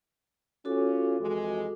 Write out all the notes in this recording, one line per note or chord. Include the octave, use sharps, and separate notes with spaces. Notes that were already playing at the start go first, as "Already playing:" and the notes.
C#4 F4 F#4 A4 D6
F2 E3 G#3